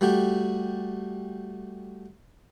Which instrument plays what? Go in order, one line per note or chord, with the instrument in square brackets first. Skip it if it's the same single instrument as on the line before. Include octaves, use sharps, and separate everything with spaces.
[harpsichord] G3 A3 F#4 G4